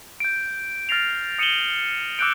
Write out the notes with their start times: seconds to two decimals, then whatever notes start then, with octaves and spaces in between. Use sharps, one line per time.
0.20 G6 D7
0.89 F6 A6 A#6 C7 F7
1.39 D#6 C#7 D#7 E7 F#7 G7
2.19 D6 E6 F#6 G6 D7